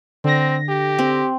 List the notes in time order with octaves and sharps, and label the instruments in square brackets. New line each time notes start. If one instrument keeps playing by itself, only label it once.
[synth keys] D3 A#6 [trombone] C4
[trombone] G4
[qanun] C4